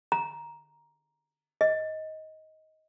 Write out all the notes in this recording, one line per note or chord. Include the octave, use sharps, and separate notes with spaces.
A#5
D#5